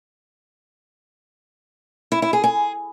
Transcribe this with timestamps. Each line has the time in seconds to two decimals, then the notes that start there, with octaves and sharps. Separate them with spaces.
2.12 E4
2.22 E4
2.33 G#4
2.44 G#4